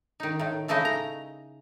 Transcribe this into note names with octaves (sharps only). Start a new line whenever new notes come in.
D#3 D#4
A2 D#3
C#3 A3 D#4 E4 D#5
A#5